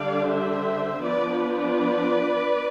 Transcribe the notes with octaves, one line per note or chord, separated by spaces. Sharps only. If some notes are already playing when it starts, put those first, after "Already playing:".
Already playing: D3 G3 D4 D5 F5
C5 E5
F3 B3 D4 B4 D5
B4 D5